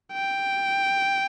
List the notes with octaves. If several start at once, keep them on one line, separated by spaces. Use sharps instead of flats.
G5